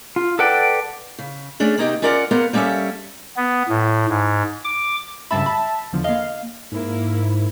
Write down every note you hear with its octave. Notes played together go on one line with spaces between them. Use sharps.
F4
A4 B4 D5 F#5 G5
C#3
A3 C#4 D4 G#4
C3 A#3 B3 D#4 F4 G4
C#4 F4 A#4 D5 F5 F#5
A#3 B3 A#4 C5 F#5
G3 A#3 C#4 A4 C#5 E5
B3
A2
G#2
D6
C#2 G2 E5 A5 B5
B5
E2 D3 F3
A#3 D#5 F5
G#2 A#3 E4